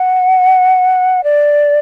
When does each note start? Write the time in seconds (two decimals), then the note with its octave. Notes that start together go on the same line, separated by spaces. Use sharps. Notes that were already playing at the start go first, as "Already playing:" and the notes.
Already playing: F#5
1.24 D5